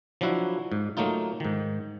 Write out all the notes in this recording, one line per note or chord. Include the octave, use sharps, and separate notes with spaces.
F3 F#3 D4 E4 F#4
G#2
F#3 A3 A#3 D#4 F4
G#2 D#3